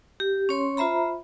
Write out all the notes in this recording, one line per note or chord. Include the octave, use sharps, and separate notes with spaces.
G4
C#4 C#5 C6
F4 C5 E5 A#5 B5